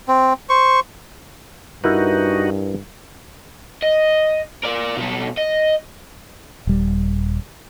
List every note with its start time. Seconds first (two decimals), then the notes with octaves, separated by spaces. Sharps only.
0.08 C4
0.49 C5 C#6
1.84 G2 D#4 E4 F#4 A#4 B4
3.82 D#5
4.63 A#4 D5
4.97 B2 A4
5.38 D#5
6.67 D#1 G3